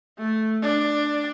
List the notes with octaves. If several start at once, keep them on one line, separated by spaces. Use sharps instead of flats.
A3
D4